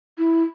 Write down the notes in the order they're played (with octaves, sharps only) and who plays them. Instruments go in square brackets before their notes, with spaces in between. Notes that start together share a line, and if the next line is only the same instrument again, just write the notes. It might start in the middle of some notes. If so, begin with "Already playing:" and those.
[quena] E4